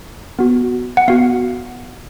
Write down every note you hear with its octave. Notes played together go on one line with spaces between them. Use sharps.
B3 F#4
F#5
B3 F#4 F5